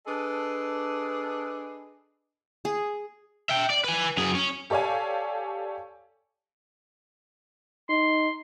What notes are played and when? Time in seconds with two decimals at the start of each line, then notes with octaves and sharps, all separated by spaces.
0.07 D4 G#4 A4 B4 D#5
2.65 G#4
3.50 E5 G5
3.70 D5
3.84 B4 G#5
4.17 F#2 G#4
4.35 C#4
4.70 G4 A4 C#5 D5 F5 G#5
7.89 D#4 C6